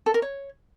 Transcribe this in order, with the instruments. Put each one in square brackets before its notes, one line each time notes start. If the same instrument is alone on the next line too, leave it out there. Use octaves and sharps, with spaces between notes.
[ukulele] A4
A#4
C#5